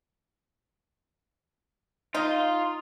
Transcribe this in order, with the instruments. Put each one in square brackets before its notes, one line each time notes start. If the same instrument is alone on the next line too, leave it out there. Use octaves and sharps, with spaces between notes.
[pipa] D#4 [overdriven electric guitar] F4